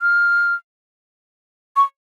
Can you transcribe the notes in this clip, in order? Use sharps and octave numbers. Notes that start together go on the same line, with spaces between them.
F6
C#6